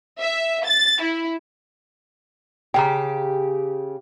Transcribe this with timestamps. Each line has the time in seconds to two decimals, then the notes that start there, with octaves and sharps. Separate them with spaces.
0.19 E5
0.65 A6
1.00 E4
2.74 C#3 G4 G5 A#5